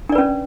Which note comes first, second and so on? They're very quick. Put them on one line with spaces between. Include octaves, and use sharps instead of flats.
D4 D5 B4 C#4